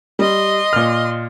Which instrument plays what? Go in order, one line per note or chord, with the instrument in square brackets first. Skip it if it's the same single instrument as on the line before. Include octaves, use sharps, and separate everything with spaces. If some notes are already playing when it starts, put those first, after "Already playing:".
[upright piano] G3 [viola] D#5 C6
[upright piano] A#2 F6